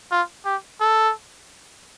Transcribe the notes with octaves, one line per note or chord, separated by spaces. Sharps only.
F4
G4
A4